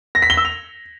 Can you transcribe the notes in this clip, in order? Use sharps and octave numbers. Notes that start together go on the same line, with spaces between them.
A#6
B6
G7
E6
F7